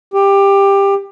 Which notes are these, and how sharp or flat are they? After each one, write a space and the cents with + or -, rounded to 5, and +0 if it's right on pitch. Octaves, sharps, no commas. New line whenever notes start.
G4 +15